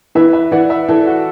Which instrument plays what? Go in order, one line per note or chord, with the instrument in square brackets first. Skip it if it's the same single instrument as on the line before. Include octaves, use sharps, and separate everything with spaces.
[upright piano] E3 [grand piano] B4 E5
[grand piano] B4 E5
[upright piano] E3 [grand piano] D5 F#5
[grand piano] B4 E5
[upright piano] E3 [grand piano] A4 D5
[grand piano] F#4